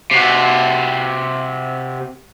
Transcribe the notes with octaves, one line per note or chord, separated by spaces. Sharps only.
C3 F#4